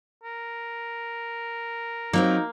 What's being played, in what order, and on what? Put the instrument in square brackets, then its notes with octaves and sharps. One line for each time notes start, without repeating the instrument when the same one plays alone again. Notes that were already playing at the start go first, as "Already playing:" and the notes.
[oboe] A#4
[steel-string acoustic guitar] F#3 C4 F4 [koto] A#3 [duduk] D#4